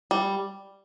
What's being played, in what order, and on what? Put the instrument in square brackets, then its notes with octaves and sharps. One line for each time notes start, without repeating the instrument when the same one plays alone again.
[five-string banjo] G3